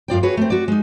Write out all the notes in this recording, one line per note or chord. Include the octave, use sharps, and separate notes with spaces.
F#2 F4 D5 G5
F#4 G#4 B4 C#5
A3 C4
F#4 D5
G#3 D#4